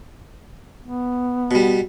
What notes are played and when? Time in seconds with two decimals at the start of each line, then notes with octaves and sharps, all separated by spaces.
0.83 B3
1.51 B2 G3